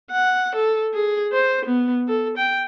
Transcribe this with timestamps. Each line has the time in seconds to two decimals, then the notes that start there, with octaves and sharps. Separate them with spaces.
0.11 F#5
0.55 A4
0.94 G#4
1.32 C5
1.65 B3
2.08 A4
2.37 G5